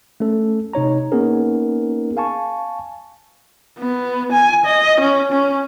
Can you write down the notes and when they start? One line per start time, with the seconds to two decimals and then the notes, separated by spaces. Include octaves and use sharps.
0.20 A3 C#4 A4
0.73 C3 D#4 C#5 A#5
1.12 A#3 B3 C#4 D#4 G#4 A#4
2.17 F5 G#5 A5 C#6
3.78 B3
4.32 G#5
4.65 D#5
5.00 C#4
5.32 C#4